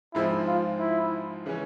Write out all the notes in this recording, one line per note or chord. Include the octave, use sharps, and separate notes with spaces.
G#2 F3 G#3 C4 E4
F4
E4
C#3 E3 G#3 C#4